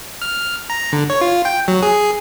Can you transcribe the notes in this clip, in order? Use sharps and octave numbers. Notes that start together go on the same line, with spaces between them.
F6
A#5
D3
C#5
F4
G5
F#3
G#4